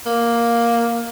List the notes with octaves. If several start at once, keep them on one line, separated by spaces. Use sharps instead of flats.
A#3